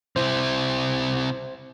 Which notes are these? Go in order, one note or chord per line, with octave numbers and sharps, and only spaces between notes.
C3 E4 C5